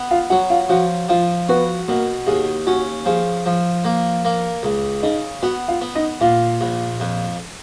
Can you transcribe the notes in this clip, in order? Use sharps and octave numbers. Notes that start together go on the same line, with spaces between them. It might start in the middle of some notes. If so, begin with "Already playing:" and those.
Already playing: B3
F4 F5
F#3 F#4 F#5
F4 F5
F3 F#4 F#5
F3 F4 F5
B3 F#4 B4
B2 A#3 A#4
D#2 G#4
C#4 F#4
F3 G#4
F3
A#3
A#3
C#2
C#3 D#4 D#5
B3 F#4 F#5
F4 F5
B3
D#4 D#5
A#2 F4 F5
A#1
F2